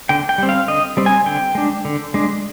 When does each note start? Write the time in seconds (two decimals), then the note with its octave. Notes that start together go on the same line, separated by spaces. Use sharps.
0.09 D3 G5
0.29 G5
0.38 G3 C4
0.49 F5
0.68 D3 D#5
0.97 G3 C4
1.06 G#5
1.26 D3 G5
1.55 G#3 D4
1.85 D3
2.14 G#3 D4